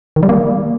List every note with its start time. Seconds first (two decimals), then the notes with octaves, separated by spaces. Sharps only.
0.16 D#3
0.23 G3
0.29 A#3